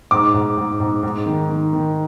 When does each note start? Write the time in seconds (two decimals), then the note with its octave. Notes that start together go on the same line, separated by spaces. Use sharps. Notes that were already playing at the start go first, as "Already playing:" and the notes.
0.11 G#2 D6
0.34 G#2
0.57 G#2
0.80 G#2
1.03 G#2
1.26 D#3
1.49 D#3
1.73 D#3